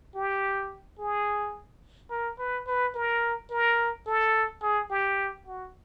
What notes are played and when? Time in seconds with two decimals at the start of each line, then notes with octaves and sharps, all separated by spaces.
0.15 G4
0.99 G#4
2.11 A#4
2.39 B4
2.67 B4
2.95 A#4
3.51 A#4
4.07 A4
4.63 G#4
4.91 G4
5.47 F#4